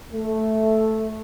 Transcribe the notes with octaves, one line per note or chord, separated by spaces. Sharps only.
A3